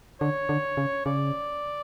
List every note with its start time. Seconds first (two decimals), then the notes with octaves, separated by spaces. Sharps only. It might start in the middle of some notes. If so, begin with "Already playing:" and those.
0.21 D3 C#5
0.49 D3
0.77 C#3
1.06 C#3 D5